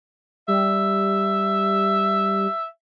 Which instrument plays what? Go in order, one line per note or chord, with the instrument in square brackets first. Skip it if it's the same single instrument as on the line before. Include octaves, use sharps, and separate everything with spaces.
[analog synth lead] G3 [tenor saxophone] E5